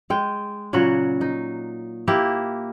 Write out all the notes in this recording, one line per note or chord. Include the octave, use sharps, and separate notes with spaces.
G#3 G5
A#2 C#3 F#3 F#4
D#4
A#3 E4 G4